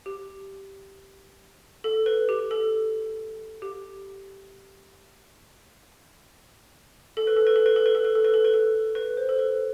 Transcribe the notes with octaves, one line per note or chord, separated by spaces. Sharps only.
G4
A4
B4
G4
A4
G4
A4
B4
A4
B4
A4
B4
A4
B4
A4
B4
A4
B4
A4
B4
A4
B4
C5
A4
B4